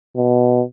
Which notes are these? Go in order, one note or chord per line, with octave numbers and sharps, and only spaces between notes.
B2